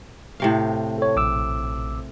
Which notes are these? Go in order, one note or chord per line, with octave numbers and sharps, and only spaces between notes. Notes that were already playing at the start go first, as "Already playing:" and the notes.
A2 C3 F5
A4 C#5
A#1 D6 E6